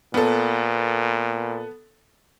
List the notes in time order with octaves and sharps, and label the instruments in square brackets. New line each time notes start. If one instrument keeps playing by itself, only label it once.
[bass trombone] A#2 [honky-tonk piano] B3 A4